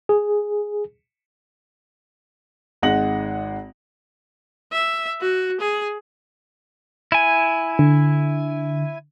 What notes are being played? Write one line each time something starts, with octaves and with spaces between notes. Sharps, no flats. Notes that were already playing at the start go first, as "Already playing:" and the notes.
G#4
G#1 G#3 D#4 F#5 A#6 F#7
E5
F#4
G#4
E4 G#5
D3